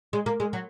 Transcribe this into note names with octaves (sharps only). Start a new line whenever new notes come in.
G#3
A#3
G#3
F#3